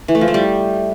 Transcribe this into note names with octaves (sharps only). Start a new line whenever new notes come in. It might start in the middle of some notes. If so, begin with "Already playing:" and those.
E3
A3
F3
A3
G3